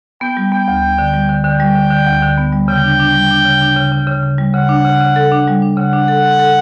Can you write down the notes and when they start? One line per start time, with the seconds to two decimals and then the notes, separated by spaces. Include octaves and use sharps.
0.21 B3 G5
0.37 G3
0.52 B3 G5
0.68 D2
0.83 D2
0.98 D3
1.14 G3
1.29 D3
1.44 D3 G5
1.60 G3
1.75 D3
1.91 D3
2.07 D2
2.22 D3
2.37 B3
2.53 G3
2.68 C#3 G5
2.84 D4
3.00 D4
3.14 G3
3.31 D4
3.45 C#3
3.62 D4
3.76 C#3
3.92 C#3
4.07 C#3
4.23 C#3
4.38 G3
4.54 C#3 F#5
4.69 D4
4.84 C#3
5.00 C#3
5.16 A4
5.32 D4
5.47 G3
5.62 D4
5.77 C#3 F#5
5.93 D4
6.08 A4
6.24 A4
6.39 A4